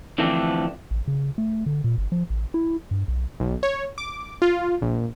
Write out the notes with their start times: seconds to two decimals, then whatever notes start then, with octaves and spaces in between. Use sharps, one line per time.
0.18 D3 E3 F3 A3 C4 D4
0.91 A1
1.08 C#3
1.38 A3
1.66 D3
1.84 A#2
1.98 G1
2.12 F3
2.30 A1
2.54 E4
2.91 G2
3.08 B1
3.40 B1
3.63 C#5
3.98 D6
4.42 F4
4.82 A#1